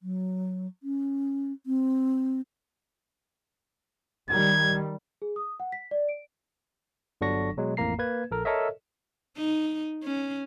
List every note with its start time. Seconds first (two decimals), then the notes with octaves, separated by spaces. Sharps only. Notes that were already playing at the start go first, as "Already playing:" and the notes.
0.02 F#3
0.83 C#4
1.66 C4
4.30 D#3 G3 G#6
5.22 G#4
5.36 D#6
5.60 F#5
5.72 B6
5.91 D5
6.09 D7
7.21 G1 D3 F#3 D4 C#6 A#6
7.57 B2 F#3 G#3
7.77 A1 F2 A2 A#3 A#5 C7
7.99 A#3 B4 G#6
8.31 A#1 A4 A#4
8.45 A4 A#4 C#5 D#5 E5
9.37 D#4
10.03 C#4